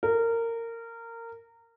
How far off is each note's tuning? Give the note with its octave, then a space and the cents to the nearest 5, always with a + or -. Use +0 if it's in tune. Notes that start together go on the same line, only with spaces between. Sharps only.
A#4 -20